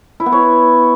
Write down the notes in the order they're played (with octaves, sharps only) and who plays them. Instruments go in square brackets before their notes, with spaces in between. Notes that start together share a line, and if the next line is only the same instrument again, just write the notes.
[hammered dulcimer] E4
B3
C#5